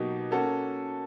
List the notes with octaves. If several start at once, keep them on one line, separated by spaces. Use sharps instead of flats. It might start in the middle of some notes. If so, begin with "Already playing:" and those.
Already playing: B2 F#3 A#3 D#4 G4
A#3 C#4 F#4 A4